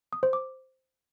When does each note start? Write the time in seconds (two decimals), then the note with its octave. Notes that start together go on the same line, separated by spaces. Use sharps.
0.13 D#6
0.23 C5
0.33 D6